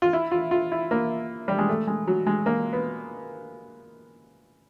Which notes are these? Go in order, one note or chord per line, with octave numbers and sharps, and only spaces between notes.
F4
E4
F4
F4
E4
A#3
G3
G#3
A3
G#3
F#3
G#3
A#3
B3